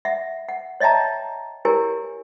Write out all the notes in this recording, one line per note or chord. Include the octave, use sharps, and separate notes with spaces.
E5 F#5
F#5
C#5 D#5 E5 G5 A5 A#5
E4 G4 A#4 C#5 G#5